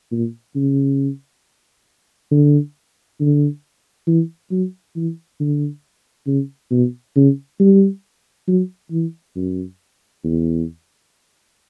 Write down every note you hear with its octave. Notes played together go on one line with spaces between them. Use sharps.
A#2
C#3
D3
D3
E3
F#3
E3
D3
C#3
B2
C#3
G3
F#3
E3
F#2
E2